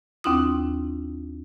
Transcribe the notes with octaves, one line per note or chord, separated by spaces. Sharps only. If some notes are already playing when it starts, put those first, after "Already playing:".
D#2 C4 D4 E4 F4 D#6